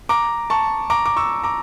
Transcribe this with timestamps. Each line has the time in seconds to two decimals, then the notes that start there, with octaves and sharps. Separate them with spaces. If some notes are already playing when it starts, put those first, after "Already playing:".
0.09 A#5 D6
0.50 A5 C#6
0.90 A#5 D6
1.06 D6
1.16 C#6 E6
1.44 A#5 D6